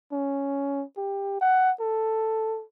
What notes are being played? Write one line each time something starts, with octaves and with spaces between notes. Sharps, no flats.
C#4
G4
F#5
A4